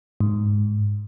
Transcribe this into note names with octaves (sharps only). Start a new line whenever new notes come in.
G#2